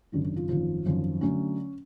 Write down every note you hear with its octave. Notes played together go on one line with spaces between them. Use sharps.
G#1 F#2 C#3 D4
D4
F4
G#1 F#2 F3 F4
G#1 F#2 F3
D3 F#3 A3 C#4